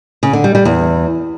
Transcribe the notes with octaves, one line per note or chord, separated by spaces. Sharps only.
C#3
D3
G3
G3
E2